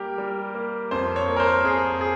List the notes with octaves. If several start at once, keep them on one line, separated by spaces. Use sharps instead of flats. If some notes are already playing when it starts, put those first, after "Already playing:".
Already playing: G3 A#3 G4 A#4
G3
A#3
F2 C5
C#5
A#3
A#4
C5
F2 G#4
G#4